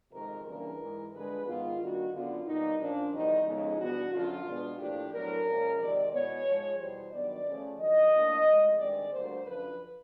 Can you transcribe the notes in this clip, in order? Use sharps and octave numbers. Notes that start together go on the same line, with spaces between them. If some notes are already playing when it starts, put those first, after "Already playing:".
F2 C3 D#3 G#3 A#4
C#3 E3 G3 A#3 D4 A#4
G#2 E3 G#3
G2 D3 F3 G#3 B4
G#2 D#3 G#3 B3 F4
G2 D#3 G3 A#3 D4 F#4
F#2 D3 F#3 B3 F4
B2 G3 A#3 D#4
A#2 F3 A#3 C#4 D4
E2 C3 D#3 G3 D#4
F2 C#3 F3 G#3 B3 D#4
E2 B2 G3 B3 D4 F#4
F#2 D3 F3 F4
B2 G#3 B3 D4
A2 F3 A#3 D4 G4
A2 F#3 B3 D4 A#4
A#2 F3 G#3 C#4
C3 D#3 G#3 C4 D5
E2 B2 G#3 B3 C#5
G#2 F3 G#3
E2 B2 G3 C5
G2 D#3 F#3 B3 D5
C#3 F3 A3 C#4
G2 D#3 F#3 D#5
A2 F3 A#3 D4
A2 F3 G#3 C4
G2 D#3 G#3 C4 D5
D2 D3 G3 A#3 C5
F#2 D3 F3 B4